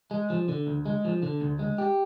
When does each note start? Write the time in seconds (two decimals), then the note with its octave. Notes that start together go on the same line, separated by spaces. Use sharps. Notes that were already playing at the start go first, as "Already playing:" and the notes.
0.11 G#3
0.30 F3
0.48 D3
0.67 D2
0.86 G#3
1.05 F3
1.23 D3
1.41 D2
1.59 G#3
1.78 G4